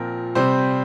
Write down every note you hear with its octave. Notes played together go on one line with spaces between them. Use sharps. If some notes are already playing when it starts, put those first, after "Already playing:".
Already playing: A#2 F3 C4 A#4
C3 G3 C4 C5